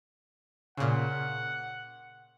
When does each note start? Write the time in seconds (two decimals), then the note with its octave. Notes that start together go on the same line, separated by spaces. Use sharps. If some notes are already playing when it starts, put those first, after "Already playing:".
0.77 A#2 C#3 F#5